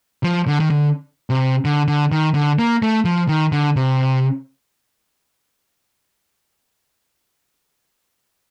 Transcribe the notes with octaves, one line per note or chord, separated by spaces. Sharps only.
F3
D3
D#3
D3
C3
D3
D3
D#3
D3
A#3
A3
F3
D#3
D3
C3